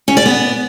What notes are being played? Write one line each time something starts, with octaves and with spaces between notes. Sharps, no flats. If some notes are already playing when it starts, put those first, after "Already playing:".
C#4
D5
B3